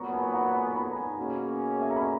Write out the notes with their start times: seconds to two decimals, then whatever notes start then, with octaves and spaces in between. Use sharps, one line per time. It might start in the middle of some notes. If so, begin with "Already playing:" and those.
Already playing: A#2 F#3 B3 A#5 C#6
0.13 G#5 B5
0.33 F#5 A#5
0.54 G#5 B5
0.75 G#5 B5
0.91 A#5
0.96 G#5 B5
1.17 B2 A#3 C#4 G#4
1.80 E5 G#5
1.90 A#5
1.96 G#5 B5